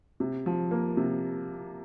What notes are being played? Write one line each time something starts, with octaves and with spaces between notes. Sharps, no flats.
C3
F3
A#3
C3